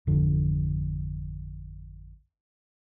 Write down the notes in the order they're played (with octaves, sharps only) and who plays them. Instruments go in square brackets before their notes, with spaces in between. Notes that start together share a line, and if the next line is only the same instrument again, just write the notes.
[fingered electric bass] G#1 F2 D3